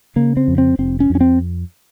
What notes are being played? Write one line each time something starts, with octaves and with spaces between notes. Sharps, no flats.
C#3 A#3
C4
F2
C4
F1 C4
C#4
F2
C#4
C4